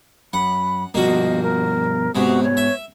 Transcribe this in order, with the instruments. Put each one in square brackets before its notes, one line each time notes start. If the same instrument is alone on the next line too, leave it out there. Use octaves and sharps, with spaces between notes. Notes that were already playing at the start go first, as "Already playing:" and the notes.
[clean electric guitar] F#2 [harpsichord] F#5 [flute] B5
[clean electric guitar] G2 B2 F3 [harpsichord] A#3 F#4 [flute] D#5
[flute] A#4
[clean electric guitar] G#2 B3 [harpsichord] C3 G#3 [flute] F#4
[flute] C#5
[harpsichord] E5